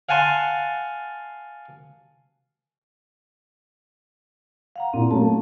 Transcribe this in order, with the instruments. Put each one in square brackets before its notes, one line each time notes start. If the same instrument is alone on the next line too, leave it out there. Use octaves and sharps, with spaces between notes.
[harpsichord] F5 F#5 G#5 A5 C6
[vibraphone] F5 F#5 A#5
[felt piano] A#2 E4 [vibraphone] C4
[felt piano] F#3 A3 C#4 [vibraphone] A5